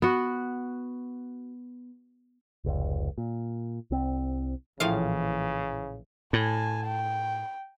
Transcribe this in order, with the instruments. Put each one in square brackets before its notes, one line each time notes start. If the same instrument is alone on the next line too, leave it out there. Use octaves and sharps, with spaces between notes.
[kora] B3 F#4
[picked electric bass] F1 C#2
A#2
C2 C4
[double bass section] A#1 E3 [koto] A2 F3 F5 [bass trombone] C#3
[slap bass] A2 [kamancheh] G#5 A5
[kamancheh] G5